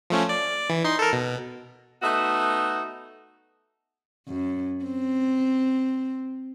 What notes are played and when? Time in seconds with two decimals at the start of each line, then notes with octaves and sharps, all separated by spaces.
0.10 F3 A3 C#4
0.29 D5
0.70 E3
0.84 D#4 C6
0.99 A4 A#4
1.13 B2
2.02 A3 B3 D#4 F#4 E5
4.27 F#2
4.85 C4